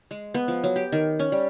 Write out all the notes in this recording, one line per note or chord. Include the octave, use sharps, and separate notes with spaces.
G#3
B3
F3
F#3
G4
D#3
C#4
G3